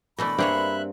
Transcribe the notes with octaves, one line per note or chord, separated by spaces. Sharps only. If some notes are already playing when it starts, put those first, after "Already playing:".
B2 E3 A3 D4 B4 D#5 B5
G2 A#3 C4 G#4 C#5 E5 G5 F#6